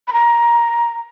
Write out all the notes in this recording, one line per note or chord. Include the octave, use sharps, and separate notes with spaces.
B5
A#5